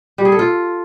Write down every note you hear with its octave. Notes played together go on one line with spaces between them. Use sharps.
G3
G#4
A4
F4